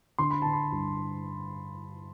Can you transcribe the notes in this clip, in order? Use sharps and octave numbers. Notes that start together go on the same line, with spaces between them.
D3 C6
B5
D3 A5
B5
G2